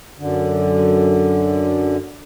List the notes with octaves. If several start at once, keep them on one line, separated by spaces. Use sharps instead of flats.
F#2 D3